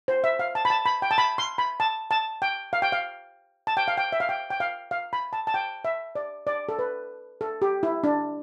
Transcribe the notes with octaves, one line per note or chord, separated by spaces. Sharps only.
C5
E5
F5
A5
B5
A5
B5
G5
A5
B5
C6
B5
A5
A5
G5
F5
G5
F5
A5
G5
F5
G5
E5
F5
G5
G5
F5
F5
B5
A5
A5
G5
E5
D5
D5
A4
B4
A4
G4
E4
D4